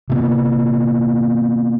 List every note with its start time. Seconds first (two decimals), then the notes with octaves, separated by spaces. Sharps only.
0.10 C3 A#3 B3